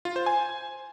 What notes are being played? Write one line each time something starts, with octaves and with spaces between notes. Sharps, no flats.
F4
C5
G#5